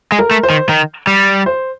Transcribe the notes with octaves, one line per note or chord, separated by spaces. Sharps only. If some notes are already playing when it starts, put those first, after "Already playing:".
G#3
A#4
A3
C5
D#3
D#3
G3
C5